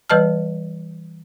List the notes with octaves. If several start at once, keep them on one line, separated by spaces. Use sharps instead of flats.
E3 G3 B4 D#5 A5 F6